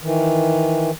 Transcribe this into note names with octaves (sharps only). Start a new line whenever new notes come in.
D#3 E3